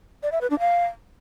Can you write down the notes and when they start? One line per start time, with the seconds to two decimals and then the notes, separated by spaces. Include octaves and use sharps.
0.23 D5
0.32 E5
0.41 B4
0.50 D4
0.60 F5